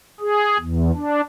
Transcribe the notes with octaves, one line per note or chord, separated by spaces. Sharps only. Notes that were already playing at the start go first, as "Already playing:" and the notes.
G#4
E2
D4